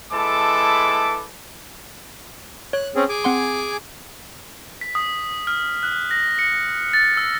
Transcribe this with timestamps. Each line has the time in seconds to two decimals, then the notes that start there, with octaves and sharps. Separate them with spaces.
0.12 G#3 E4 A4 B4 A5 D6
2.73 C#5 F#6
2.95 C4 C#4 G#4
3.09 G#4 G#5 D6
3.24 C4 F#5 C6
4.81 B6
4.95 D#6
5.47 F6
5.83 F#6
6.11 A#6
6.39 C#7
6.93 A6
7.17 E6